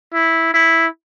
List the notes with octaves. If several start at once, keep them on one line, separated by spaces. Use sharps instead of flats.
E4
E4